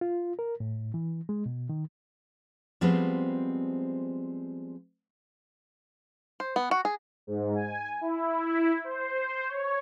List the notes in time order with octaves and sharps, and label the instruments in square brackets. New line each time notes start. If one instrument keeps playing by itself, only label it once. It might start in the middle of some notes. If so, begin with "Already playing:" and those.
[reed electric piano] F4
A#4
A2
E3
G#3
B2
D#3
[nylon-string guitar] F3 G3 G#3 B3 C4
[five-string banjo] C5
B3
F#4
G#4
[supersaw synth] G#2
G#5
E4
E4
C5
C#5